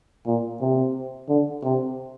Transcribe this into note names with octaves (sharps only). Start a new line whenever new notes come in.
A#2
C3
D3
C3